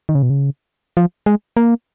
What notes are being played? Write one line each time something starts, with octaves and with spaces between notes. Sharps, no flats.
D#3
C#3
B2
C#3
F3
G#3
A#3